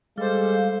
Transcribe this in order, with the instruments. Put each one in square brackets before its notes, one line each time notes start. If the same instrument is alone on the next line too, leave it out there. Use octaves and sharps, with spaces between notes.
[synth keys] G3 [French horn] G#3 [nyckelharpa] A4 C5 [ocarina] F5